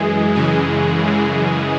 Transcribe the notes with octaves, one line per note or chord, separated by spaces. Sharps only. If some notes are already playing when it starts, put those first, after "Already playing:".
Already playing: F#2 E3 G#3 G#4
F#2 C#3 E3 G#3 G#4
F#2 C#3 E3